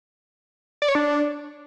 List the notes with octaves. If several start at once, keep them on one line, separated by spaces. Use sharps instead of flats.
D5
C#5
D4